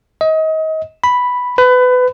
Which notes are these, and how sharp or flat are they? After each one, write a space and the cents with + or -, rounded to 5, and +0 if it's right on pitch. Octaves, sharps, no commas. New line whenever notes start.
D#5 +30
B5 +0
B4 +25